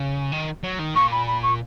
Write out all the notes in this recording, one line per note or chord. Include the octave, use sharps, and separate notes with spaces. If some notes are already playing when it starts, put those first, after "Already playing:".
Already playing: C#3
D#3
F#3
D#3
A#2 C#6
B5
B5
C#6